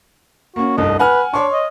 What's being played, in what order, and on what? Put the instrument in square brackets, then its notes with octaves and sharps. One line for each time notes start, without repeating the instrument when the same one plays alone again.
[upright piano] A#3 C#4 [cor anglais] F#4
[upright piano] F1 C2 G2 [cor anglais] D#5
[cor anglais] B4 [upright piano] F#5 G#5 F6
[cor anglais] D4 [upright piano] C#5 C6 C#6
[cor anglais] D#5